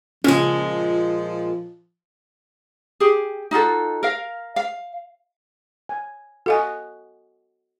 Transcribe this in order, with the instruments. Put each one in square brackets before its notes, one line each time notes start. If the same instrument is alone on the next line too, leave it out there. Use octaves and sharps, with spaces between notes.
[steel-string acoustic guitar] A#2 G#3 [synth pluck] C#3 C#4 [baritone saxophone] F3
[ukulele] G4 G#4
D#4 F4 F#4 A4
A#4 F5
F5
[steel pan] G#5
[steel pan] F#4 D#5 [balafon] A4 F5 G#5